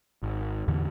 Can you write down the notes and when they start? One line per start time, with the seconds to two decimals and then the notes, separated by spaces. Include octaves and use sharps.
0.23 G#1
0.68 E2 A2 D3 E3